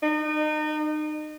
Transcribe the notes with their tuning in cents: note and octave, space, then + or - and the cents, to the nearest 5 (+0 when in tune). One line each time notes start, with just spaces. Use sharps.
D#4 -30